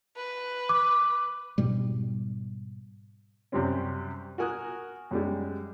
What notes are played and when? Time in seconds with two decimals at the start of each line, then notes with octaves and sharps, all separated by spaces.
0.17 B4
0.69 D6
1.58 G#2 B2 G3
3.52 F#2 C3 G3 C4 C#4
4.38 F#4 A#4 G#5 D#6 F#6
5.11 F#2 G3 G#3